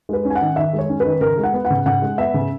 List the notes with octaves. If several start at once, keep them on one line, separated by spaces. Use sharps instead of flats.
G#3 B4
C#4
G#5
F#5
D#3
D#3 E5
G#3
C#5
C#4
B4
D#3
C#3 A#4
G#3
F#5
B3
F#5
C#3
C#3 F#5
G#3
B3 E5
C#3